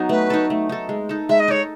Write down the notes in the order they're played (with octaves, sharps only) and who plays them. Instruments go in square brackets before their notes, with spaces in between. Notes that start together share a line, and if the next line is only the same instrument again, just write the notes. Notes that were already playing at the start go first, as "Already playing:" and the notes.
Already playing: [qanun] F#3 B3 D#4
[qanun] A3 [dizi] B4
[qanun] D#4 A4
A3
D#4 A4
G#3
D#4 A4
[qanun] G#3 [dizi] E5
[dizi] D#5
[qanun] D#4 A4 [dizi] C#5